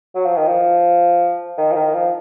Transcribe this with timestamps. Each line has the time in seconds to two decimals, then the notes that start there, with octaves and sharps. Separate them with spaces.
0.15 F#3
0.25 F3
0.37 D#3
0.47 F3
1.58 D#3
1.71 F3
1.76 D#3
1.94 F3